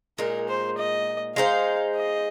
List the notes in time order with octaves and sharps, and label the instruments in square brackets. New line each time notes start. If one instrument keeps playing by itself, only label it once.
[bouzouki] A#2 G#3 D#4 [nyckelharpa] A#4
[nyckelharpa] C5
D#5
[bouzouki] G#3 D#4 C5 [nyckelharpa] F5
[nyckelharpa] D#5